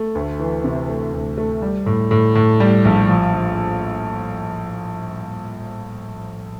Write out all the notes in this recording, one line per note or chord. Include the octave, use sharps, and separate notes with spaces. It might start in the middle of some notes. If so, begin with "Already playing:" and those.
Already playing: A3
D2
E3
C3
A3
D2
A3
G3
A2
A2
A2
G3
A#1
F3
F3